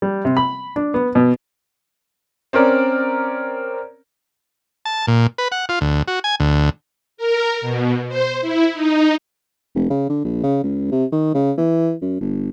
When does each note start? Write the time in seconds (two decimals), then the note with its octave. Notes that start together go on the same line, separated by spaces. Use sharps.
0.02 G3
0.25 C3
0.37 B5
0.76 D4
0.94 B3
1.15 B2
2.53 C4 C#4 A#4 D5
4.85 A5
5.07 A#2
5.38 B4
5.52 F#5
5.69 F4
5.81 D2
6.08 F#4
6.24 G#5
6.40 D2
7.17 A#4
7.61 B2
8.08 C5
8.41 E4
8.73 D#4
9.75 F1
9.90 C#3
10.09 D3
10.24 A#1
10.43 C#3
10.64 C#2
10.92 C3
11.12 D#3
11.34 C#3
11.58 E3
12.01 F#2
12.21 G1